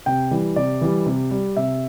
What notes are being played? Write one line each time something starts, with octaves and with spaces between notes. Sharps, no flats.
C3 G5
E3 G3
C3 D5
E3 G3
C3
G3
C3 E5